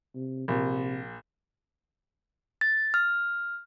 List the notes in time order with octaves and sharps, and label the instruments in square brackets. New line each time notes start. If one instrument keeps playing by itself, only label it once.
[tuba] C3
[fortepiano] A#1 [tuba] C3
[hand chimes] A6
F6